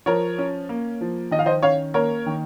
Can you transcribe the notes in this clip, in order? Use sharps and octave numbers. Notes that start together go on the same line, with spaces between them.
F3 A#4 C#5
C#4
A#3
F3
D#3 D#5
F5
C5 D#5
C#4 C#5 F5
A#3 A#4 C#5
D#3